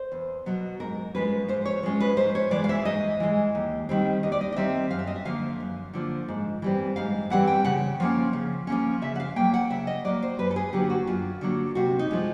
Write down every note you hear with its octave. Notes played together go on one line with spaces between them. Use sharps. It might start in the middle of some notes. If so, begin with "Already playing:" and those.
Already playing: C5
E2
B2 F#3 B3
G#2 A#4
F3 G#3 C#4 B4
G#2 C5
C#5
F3 G#3 C#4
B4
G#2 C5
C#5
E3 G#3 D5
F5
E5
G#2 D#5
E3 G#3
D#2
D#3 G3 C4
D#2 D#5
D5
D#5
D#5
D#3 G3 C4 E5
F#2 F5
E5
D#5
E5
D3 F3 A#3 F5
F#2
D3 F3 A#3
G#2
E3 G3 C4
G#2 F5
E3 G3 C4 F#5
G5
C#3 F#5
F3 A#3 C#4
C#3
F3 A#3 C#4
C#3 E5
F#5
F5
F#3 A#3 G5
F#5
C#3 E5
D#5
F#3 A#3 D5
C5
F#2 B4
A4
G#4
D3 F#3 A#3 G4
F#4
F#2 F4
D3 F#3 A#3
C3 F#4
D#4
F3 G#3